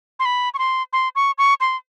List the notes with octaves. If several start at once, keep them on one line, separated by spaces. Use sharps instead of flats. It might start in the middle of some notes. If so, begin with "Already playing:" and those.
C6
B5
C#6
C6
C6
C#6
C#6
C6